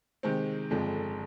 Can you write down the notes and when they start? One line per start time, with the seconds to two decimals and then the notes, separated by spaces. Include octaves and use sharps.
0.23 C3 D#3 G#3 C4
0.70 G1 F2 D3 F3 G#3